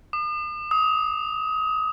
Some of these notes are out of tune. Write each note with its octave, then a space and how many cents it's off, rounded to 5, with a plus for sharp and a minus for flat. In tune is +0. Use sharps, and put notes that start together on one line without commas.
D#6 -45
D#6 +30